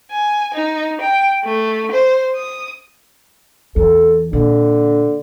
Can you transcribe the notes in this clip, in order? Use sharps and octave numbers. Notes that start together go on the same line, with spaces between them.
G#5
D#4
G5
A3
C5
D#6
E2 A4
A#2 D3